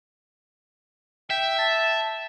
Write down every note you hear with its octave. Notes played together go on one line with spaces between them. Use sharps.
E5 G5
A5